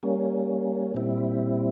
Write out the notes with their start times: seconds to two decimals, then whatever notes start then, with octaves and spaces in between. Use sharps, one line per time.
0.03 G3 A#3 C#4
0.94 A#2 G3 C4 E4